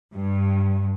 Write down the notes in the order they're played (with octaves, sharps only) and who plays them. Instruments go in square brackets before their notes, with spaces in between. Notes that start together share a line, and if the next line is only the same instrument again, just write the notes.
[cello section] G2